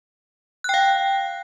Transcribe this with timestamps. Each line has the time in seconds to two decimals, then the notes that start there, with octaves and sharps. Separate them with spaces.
0.64 F#6
0.69 G5
0.74 F5